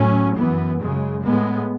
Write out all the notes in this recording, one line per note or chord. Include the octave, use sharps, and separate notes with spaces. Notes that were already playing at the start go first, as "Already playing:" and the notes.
Already playing: A2 F#3 C#4
F#2 E3 B3
F#2 C#3 G#3
A2 G#3 B3